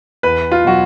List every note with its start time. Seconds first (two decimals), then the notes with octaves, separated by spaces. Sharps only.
0.23 E2 B4
0.52 F4
0.65 B2 F#3 F#4